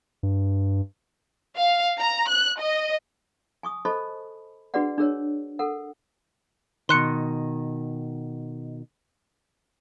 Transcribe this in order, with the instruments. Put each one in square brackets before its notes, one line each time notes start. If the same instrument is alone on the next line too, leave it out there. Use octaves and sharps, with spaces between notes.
[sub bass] G2
[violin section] F5
A#5
F#6
D#5
[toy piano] G#5 C#6 D#6
A4 C5 D#5 A5 B5 C#6
D4 F#4 G#4 B4 D5 F#5
D4 G#4 A#4 C#5
A4 A#4 F#5
[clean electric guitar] B2 D#3 [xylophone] C6 F#6 C#7